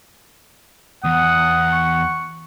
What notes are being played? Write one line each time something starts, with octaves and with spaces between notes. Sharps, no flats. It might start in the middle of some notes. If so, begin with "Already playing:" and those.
E2 F#5 D#6
C#6